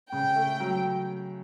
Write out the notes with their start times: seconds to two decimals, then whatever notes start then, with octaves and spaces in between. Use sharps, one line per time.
0.13 C#3 G5
0.36 A3
0.60 F#3